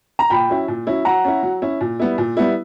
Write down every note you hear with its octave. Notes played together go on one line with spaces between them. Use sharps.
A#5
A#2 G5 B5
F#3 C#4 E4
A#2
F#3 C#4 E4
F#3 F#5 A#5
C#4 E4
F#3
C#4 E4
A#2
G3 B3 E4
A#2
G3 B3 E4